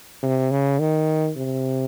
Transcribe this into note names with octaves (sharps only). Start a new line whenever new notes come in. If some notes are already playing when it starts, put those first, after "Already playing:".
C3
C#3
D#3
C3